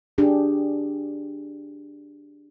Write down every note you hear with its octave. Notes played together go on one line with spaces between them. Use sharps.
D4 G4 G#4